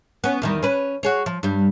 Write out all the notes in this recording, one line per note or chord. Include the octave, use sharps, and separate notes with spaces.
B3 C#4
E2 D#3 G3
C#4 B4
F#4 G#4 C#5
F3
G2 G3